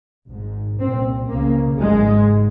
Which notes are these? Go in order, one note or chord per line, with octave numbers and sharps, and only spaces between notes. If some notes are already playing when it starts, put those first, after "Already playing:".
G#1 G#2
C2 A#2 C4
C#2 C#3 A#3
G#1 G#2 G#3